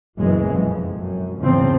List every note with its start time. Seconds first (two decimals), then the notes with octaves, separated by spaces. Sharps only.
0.19 F#1 B1 F#2 E3 G#3
0.52 F2
0.99 F#2
1.41 E2 G#2 C#3 F3 C4